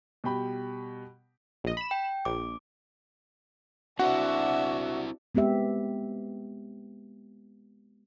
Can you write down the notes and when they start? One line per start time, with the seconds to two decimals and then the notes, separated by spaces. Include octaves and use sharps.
0.24 B2 G3 G5 B5
1.64 A#1 D#5
1.77 B5 E7
1.91 G5
2.25 A#1 D6
3.99 C4 D4 E4 F#4 C5 E5 F#5
5.35 G#3 B3 C4 G4 E5